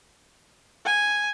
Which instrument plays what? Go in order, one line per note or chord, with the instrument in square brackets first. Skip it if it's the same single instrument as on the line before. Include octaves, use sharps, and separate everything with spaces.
[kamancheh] G#5